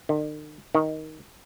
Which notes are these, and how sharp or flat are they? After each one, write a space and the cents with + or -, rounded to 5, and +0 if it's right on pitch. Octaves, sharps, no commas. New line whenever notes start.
D#3 -45
D#3 +10